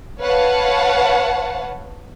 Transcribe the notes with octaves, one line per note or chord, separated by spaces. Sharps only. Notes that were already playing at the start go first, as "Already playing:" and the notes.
B4 C#5 F5 F#5 A5